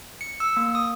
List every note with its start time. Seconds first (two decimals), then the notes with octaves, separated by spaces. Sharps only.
0.21 C#7
0.40 E6
0.57 A#3
0.75 D#6